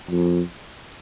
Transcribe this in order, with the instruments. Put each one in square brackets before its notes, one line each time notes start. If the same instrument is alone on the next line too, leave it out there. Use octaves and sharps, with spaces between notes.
[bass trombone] F2